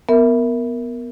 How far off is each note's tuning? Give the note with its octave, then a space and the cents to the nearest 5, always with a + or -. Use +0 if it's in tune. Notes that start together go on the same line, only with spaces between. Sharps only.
B3 +0 A#4 -5 E5 +0